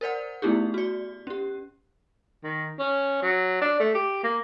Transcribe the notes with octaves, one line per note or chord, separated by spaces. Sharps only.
A#4 C5 D5 F#5
A3 B3 D#4 E4 G4 G#4
F#4 D5
C#4 G4
D#3
C#4
F#3
D4
A3
G4
A#3